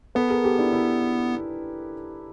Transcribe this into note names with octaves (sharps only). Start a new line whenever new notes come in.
B3 A4 B4
G#4 A#4
G4 A4
D4 E4
D4 E4